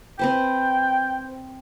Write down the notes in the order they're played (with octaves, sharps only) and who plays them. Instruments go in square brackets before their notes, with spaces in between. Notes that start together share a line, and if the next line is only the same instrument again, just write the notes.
[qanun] C4 B4 C5 [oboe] G5